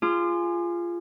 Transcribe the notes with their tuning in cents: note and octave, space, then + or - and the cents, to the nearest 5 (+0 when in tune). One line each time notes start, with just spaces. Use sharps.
F4 -15 G#4 +0 D6 +45